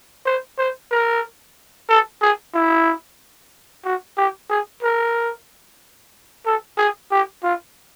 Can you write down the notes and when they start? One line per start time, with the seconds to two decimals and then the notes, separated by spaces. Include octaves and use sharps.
0.26 C5
0.58 C5
0.91 A#4
1.89 A4
2.21 G#4
2.54 E4
3.85 F#4
4.18 G4
4.50 G#4
4.83 A#4
6.46 A4
6.78 G#4
7.11 G4
7.43 F4